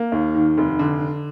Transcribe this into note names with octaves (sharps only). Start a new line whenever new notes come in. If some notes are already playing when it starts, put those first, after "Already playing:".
Already playing: A#3
D#2
D#3
F1
D3